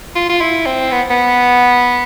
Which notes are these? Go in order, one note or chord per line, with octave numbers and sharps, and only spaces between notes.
F4
F4
E4
C4
B3
B3